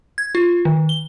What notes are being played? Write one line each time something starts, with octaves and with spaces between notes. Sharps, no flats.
G#6
F4
D#3
G7